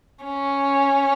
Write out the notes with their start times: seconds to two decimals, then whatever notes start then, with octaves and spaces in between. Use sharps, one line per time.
0.25 C#4